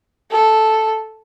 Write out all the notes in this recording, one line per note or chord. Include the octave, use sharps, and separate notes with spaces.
A4